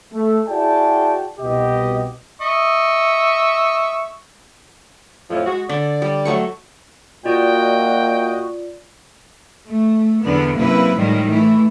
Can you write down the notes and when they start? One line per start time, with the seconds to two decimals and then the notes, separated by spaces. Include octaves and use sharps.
0.13 A3
0.47 E4 F#4 G#4 D5 G5 A5
1.40 C2 B2 G4 D#5
2.41 D#5 E5 C#6
5.30 F2 A2 F3
5.46 G#3 F#4
5.69 D3 D5
6.02 G3
6.25 F#3 A3 C#6
7.25 A#2 F4 F#4 D5 D#5 G5
9.66 A3
10.23 E2 D3 B3
10.57 F#2 C3 A#3 E4 B4
10.96 A2 D#3 F3 G3 G#3
11.28 E3 A3 E4